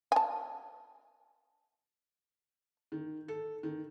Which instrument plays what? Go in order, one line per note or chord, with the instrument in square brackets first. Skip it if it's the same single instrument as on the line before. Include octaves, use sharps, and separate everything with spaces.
[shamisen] G#5 A5
[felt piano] D#3
A4
D#3